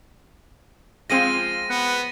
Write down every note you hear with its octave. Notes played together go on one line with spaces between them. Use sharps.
F3 G#3 C4 F4 A#6 D#7
B3